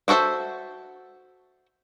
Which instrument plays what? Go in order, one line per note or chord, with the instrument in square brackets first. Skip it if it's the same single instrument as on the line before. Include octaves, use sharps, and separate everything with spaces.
[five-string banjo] D4 F#4 A4 C5 E5